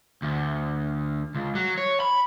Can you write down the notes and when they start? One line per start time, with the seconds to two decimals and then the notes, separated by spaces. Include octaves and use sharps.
0.22 D2
1.35 C#2
1.55 F#3
1.78 C#5
2.00 B5